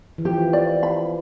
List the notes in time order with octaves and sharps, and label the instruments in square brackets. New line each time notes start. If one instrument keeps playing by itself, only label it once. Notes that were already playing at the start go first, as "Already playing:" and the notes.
[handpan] E3
[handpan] F3 [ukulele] G4
[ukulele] D5
B5